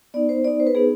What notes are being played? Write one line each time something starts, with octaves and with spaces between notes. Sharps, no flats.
B3 D#4 D5
C5
B3 D#4 D5
C5
B4
B3 D#4 G#4